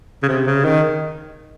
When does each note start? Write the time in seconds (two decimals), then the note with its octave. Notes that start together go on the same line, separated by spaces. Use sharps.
0.23 C#3
0.28 C3
0.46 C#3
0.64 D#3